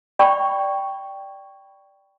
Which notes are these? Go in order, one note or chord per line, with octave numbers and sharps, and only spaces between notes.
D5 G5 B5 C#6